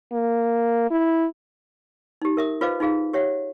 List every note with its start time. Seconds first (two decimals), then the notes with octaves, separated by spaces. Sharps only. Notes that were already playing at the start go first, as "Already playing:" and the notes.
0.12 A#3
0.91 E4
2.22 D#4 G4
2.37 A#4 E5 D#6
2.61 F4 B4 C5 D#5 F5 D6
2.80 D#4 F4 G#4 F5
3.13 G4 C#5 E5 F#5